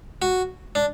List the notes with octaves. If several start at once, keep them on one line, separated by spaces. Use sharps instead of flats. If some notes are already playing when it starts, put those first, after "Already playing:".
F#4
D4